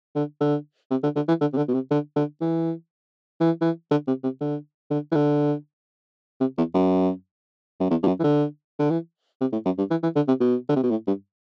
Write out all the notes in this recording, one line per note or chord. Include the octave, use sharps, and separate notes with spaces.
D3
D3
C3
D3
D3
E3
D3
C3
D3
B2
C3
D3
D3
E3
E3
E3
D3
C3
C3
D3
D3
E3
D3
C3
E2
F#2
F#2
E2
G2
F#2
E3
D3
D3
E3
C3
A2
F#2
G2
E3
E3
D3
C3
B2
D3
C3
B2
A2
G2